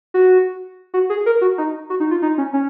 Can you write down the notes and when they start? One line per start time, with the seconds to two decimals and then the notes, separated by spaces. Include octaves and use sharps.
0.14 F#4
0.94 F#4
1.10 G#4
1.26 A#4
1.41 F#4
1.58 D#4
1.90 F#4
2.00 D#4
2.11 F4
2.22 D#4
2.38 C#4
2.53 C#4